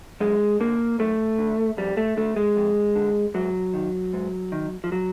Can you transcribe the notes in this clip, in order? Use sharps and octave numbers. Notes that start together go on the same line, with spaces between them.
F#2 G#3
D3 A#3
F#2 A3
D3
F2 G3
A3
D3 A3
G#3
F2
D3
G#2 F#3
D#3
G#2
D#3
F3
F#3